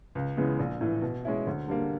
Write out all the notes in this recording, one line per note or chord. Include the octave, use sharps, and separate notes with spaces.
C#2
C#3 E3 G#3 B3
A#1
A2 E3
B2
G#3 C#4 E4
D2
D3 G3 A#3